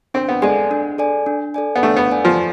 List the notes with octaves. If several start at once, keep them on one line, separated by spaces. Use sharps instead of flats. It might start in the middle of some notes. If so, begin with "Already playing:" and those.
C4 D4
B3
G#3 A4 D5 G#5
D4
A4 D5 G#5
D4
A4 D5 G#5
B3
A3 D4
B3
A4 D5 G#5
F3